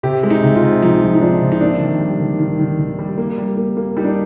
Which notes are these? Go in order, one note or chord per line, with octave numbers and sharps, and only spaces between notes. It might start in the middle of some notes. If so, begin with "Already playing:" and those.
C3 G4
G#3
D#4
C3
F4
C3
F3 D#4
F3
D#4
F3 D4
C3
D#4
A#3 D4
D#3
G3
D#3
D#3
D#3
D#3
G3
A#3
G3
A#3
A#3
G3 D#4
D4